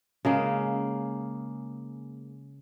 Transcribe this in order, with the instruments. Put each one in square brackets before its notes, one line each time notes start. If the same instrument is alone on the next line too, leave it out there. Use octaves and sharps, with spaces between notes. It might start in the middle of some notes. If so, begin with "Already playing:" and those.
[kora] C#3 G#3 A#3